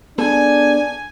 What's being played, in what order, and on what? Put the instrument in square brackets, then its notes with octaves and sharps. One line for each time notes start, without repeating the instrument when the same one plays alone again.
[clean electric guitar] B3 G#4 A4 [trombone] D4 [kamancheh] G#5